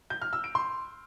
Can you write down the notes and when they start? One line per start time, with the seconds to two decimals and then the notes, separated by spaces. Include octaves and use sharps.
0.10 G6
0.22 F6
0.33 E6
0.44 D7
0.55 C6